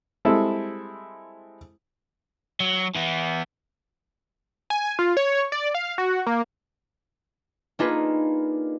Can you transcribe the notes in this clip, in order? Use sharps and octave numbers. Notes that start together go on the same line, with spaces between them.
G3 G#3 C4 E4 A4
F#3
E3 B3
G#5
F4
C#5
D5
F5
F#4
A#3
A#3 D4 D#4 F4 G#4 B4